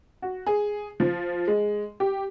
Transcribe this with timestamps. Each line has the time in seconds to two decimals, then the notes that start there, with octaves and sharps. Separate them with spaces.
0.22 F#4
0.47 G#4
1.00 F3
1.47 G#3
2.00 G4